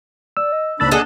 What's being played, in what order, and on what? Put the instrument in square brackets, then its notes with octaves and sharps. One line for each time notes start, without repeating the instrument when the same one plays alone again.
[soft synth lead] D5 [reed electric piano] E6
[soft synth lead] D#5
[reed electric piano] C#2 E6 A6 [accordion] G#2 D4 B5 [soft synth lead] A#3
[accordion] D4 G#4 [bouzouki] A4 D#5 F#5